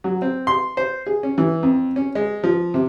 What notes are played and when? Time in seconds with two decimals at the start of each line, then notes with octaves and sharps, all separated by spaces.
0.04 F#3
0.22 C4
0.47 C6
0.77 C5
1.07 G#4
1.23 C#4
1.38 E3
1.63 F2
1.96 C#4
2.15 G#3
2.44 F3
2.74 C3